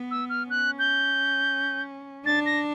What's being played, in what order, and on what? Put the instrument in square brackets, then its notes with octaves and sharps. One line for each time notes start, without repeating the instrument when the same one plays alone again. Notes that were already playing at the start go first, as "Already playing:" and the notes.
Already playing: [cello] B3
[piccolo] E6
F6
[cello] C#4 [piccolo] F#6
[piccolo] G6
[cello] D4 [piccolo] A6
[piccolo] A#6